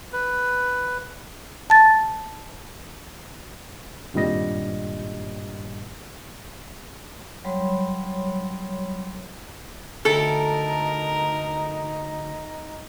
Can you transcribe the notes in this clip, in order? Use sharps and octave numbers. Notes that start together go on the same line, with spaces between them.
B4
A5 A6
G#1 G2 A#2 G3 D#5 A#6
F#3 G3 C#5 B5 C6
D2 D#4 E4 A4 A#4